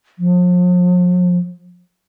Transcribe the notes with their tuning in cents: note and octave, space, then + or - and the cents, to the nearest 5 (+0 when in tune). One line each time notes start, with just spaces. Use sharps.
F3 +40